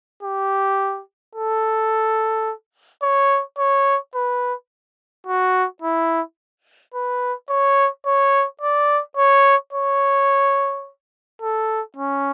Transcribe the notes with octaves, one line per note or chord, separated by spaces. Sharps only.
G4
A4
C#5
C#5
B4
F#4
E4
B4
C#5
C#5
D5
C#5
C#5
A4
C#4